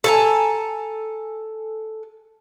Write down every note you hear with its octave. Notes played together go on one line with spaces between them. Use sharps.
A4 G#5 A#5